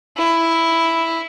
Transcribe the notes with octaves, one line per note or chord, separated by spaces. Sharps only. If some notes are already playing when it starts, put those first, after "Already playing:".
E4